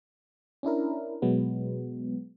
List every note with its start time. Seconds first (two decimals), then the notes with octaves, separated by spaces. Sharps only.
0.63 C#4 D4 E4 A#4
1.22 B2 F#3 G#3 B3